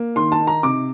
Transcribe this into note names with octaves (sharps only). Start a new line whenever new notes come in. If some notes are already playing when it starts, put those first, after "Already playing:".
Already playing: A#3
D#3 C6
A5
D#4
A#5
C3 D6